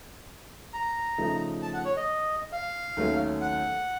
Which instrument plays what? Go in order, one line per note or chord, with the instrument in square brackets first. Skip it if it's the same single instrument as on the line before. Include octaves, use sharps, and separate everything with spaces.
[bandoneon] A#5
[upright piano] C#3 F3 A3 D#4
[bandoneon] A5
F#5
C#5
D#5
F5
[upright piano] D#2 D#3 F#3 A3 C#4
[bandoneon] F#5